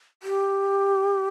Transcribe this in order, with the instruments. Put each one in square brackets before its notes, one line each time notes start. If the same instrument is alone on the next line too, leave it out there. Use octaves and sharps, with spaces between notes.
[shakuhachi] G4